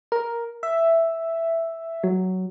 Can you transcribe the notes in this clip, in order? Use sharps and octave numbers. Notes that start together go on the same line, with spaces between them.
A#4
E5
F#3